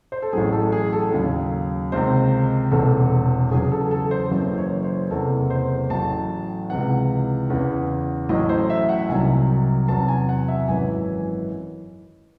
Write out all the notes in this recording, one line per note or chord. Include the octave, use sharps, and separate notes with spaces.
C5
A4
A1 A2 F#3 G#4
A4
G#4
A4
D#2 C#3 F#3
C#2 C3 D#3 C5
E1 E2 C3 A4
E2 C#3 F#3 G#4
A4
A4
C5
F#1 F#2 E3 C5
C#5
C5
F#1 E2 C3 E3 A4
C5
A1 A2 F#3 A5
C#2 C3 E3 F#5
E2 C#3 E3
A1 A2 F#3 D#5
C5
E5
F#5
C2 C3 D#3 F#3 G#5
E2 C3 F#3 A5
G#5
F#5
E5
G#1 F#2 E3 G#5